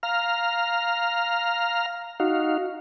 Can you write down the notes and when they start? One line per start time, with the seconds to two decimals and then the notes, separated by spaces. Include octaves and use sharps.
0.03 F5 A#5 F6
2.20 D#4 F#4 F5